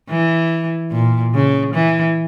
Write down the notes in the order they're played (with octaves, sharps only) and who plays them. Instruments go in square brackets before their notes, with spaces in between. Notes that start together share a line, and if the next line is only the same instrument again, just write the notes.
[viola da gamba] E3
A#2
C#3
E3